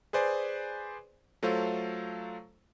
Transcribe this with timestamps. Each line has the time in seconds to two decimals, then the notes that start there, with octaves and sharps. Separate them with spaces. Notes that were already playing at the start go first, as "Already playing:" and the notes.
0.13 G#4 B4 C5 D5 G#5
1.43 F#3 A3 F4 A4 C5 F5